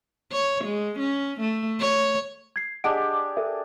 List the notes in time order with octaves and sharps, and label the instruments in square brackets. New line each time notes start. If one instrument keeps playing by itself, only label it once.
[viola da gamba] C#5
G#3
C#4
A3
C#5
[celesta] G#6 C7
[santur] D4 G4 G#4 [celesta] D#5 F#5 D7
[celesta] A4 A#4 E5